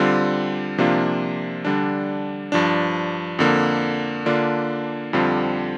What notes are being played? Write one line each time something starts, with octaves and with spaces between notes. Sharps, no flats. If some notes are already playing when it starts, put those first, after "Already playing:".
Already playing: D3 G3 C4 F4
C3 F3 A#3 D4 F4
D3 G3 D4
G2 F3 D4
F2 D3 A#3
D3 A#3 D4 F4
F2 D3 G3 C4 F4